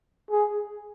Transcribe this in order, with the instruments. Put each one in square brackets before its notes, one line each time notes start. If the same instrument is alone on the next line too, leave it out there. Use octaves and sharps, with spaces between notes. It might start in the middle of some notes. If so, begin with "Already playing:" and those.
[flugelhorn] G#4